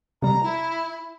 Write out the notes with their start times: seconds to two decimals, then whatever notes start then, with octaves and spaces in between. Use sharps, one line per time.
0.22 C3 G3 A#5
0.43 E4